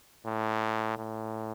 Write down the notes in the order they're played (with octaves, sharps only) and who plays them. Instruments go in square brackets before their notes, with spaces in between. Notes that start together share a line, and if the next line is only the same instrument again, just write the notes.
[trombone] A2
A2